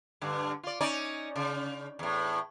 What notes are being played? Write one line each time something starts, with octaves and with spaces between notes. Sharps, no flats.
G2 D3
F4 D5
C#4 D#4 D5
C#3
E2 A2